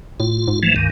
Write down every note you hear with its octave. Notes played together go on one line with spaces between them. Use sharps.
A2 F4
G#2
E3 F3 A3
C#2 G2 D#3